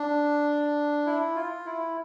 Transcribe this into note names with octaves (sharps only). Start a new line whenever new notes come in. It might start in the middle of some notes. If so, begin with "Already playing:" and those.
Already playing: D4
E4
F4
E4